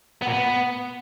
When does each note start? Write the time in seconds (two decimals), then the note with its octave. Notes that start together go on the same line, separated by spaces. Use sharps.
0.22 B3
0.27 A#2
0.32 B3